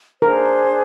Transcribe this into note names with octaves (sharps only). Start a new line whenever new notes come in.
D4 G#4 A#4 C5